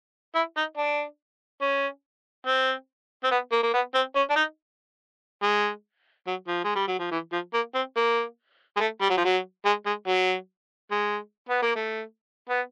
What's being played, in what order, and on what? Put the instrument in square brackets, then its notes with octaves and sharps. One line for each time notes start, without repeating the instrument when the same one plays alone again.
[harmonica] E4
D#4
D4
C#4
C4
C4
B3
A#3
A#3
B3
C4
C#4
D4
D#4
G#3
F#3
F3
G#3
G3
F#3
F3
E3
F3
A#3
C4
A#3
G#3
A3
G3
F#3
F3
F#3
G#3
G#3
F#3
G#3
B3
A#3
A3
B3